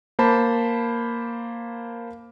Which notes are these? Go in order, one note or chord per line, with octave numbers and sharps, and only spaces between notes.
A#3 C5 A5 B5